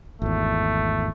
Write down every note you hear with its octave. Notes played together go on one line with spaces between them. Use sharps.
G#1 E2 A3